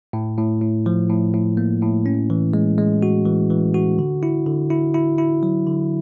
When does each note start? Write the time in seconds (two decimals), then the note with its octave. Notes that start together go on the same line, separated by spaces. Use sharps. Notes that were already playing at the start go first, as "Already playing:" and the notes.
0.13 A2
0.38 A2
0.62 A2
0.86 F3
1.10 A2
1.34 A2
1.57 A#3
1.82 A2
2.06 C#4
2.30 E3
2.54 G#3
2.78 G#3
3.03 F#4
3.25 E3
3.50 E3
3.74 F#4
3.99 D3
4.23 E4
4.46 D3
4.70 E4
4.94 E4
5.18 E4
5.43 F#3
5.67 D3